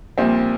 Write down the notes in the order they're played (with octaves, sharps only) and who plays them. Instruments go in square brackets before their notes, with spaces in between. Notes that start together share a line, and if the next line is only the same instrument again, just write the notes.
[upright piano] A#1 A#2 G3 C4